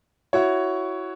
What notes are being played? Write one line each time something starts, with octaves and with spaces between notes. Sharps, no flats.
E4 F#4 C#5